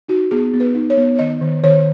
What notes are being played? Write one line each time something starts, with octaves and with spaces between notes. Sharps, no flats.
D#4 F#4
B3 G#4
B3
B4
D#4
C#5
B3
C#5
D#3 D#5
D#3
D#3 C#5